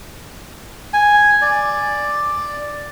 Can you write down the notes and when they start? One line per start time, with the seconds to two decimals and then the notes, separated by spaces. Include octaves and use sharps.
0.93 G#5
1.42 D5